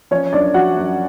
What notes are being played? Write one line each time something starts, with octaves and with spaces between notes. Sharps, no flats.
F3 C#4 C#5
F#2 D4 D5
F3 F#4 F#5
F#2